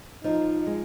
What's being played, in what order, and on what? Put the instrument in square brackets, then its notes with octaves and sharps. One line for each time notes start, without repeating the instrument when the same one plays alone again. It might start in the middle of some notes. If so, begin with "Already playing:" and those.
[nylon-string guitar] F3 [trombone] D#4
[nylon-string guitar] G#3